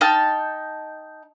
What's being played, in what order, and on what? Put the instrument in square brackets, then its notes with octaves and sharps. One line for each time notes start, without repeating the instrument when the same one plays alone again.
[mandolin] D#4 G5 A5 F6